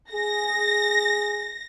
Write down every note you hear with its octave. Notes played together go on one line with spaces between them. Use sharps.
G#4 A#6